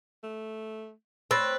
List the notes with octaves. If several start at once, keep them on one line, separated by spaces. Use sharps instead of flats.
A3
C4 B4 C#5 E6 A6 A#6